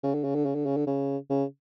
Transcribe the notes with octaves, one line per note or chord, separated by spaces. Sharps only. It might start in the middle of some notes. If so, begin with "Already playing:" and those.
C#3
D3
C#3
D3
C#3
D3
C#3
D3
C#3
C#3